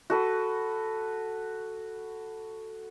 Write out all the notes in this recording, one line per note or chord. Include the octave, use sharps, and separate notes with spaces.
F#4 A4 B4